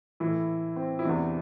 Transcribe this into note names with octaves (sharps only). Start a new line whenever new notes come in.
A2 E3 E4
C4
E4
E2 C3 E3 D4